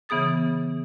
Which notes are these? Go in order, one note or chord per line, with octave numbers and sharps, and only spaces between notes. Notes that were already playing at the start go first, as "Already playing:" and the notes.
C#3 E3 B3 G#4 D#6 A6